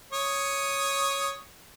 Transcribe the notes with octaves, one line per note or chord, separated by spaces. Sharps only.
C#5 C#6 D#6